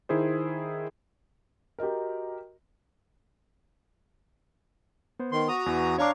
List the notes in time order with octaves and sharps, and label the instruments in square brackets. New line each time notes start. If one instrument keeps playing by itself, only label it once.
[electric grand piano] D#3 E4 G#4 C5
[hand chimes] F#4 D#5 A#5 [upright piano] G4 A#4
[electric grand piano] B3 C5
[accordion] D#3 C6
F#4 A#5 D#6
[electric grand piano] E2 E3
[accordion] D4 F5 C#6 [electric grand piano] C#5 A#5 D6